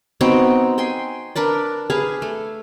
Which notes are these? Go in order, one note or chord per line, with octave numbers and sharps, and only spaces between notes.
B3 C4 D#4 F#4
G5 G#5 C6
D4 A#4 B4 D5
G#4 B4 F5 G#5
A3